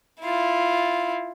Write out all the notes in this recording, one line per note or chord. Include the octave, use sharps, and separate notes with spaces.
E4 F4